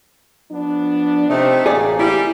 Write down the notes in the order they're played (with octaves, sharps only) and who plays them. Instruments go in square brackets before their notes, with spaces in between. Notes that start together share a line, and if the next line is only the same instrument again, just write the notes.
[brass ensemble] F3 B3 D4
[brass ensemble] C3 [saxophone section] A3 D#4
[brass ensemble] A1 A#3 G#5 [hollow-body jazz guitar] G#4 D5
[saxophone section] G3 [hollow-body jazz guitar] E4